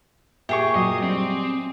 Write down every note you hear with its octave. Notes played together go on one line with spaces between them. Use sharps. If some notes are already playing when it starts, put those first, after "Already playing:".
A#2 G4 G#4 E5 C#6
A#2 F#3 D#5 D6 D#6 C7
G3 C4